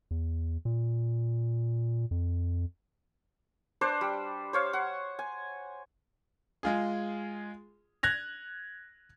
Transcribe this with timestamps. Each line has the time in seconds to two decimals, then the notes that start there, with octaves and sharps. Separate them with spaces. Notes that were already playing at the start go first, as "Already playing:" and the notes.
0.11 E2
0.65 A#2
2.11 F2
3.81 D4 B4 C5 D5
4.01 G3
4.53 C5 C#5 F5
4.73 F#5
5.19 G#5
6.63 G#3 F4 G#4
8.03 F#6 G#6 A#6 F7